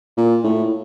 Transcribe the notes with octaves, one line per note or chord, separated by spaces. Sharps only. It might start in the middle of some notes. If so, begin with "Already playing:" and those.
A#2
A2